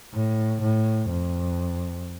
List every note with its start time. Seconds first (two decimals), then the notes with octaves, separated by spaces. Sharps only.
0.13 A2
0.62 A2
1.10 F2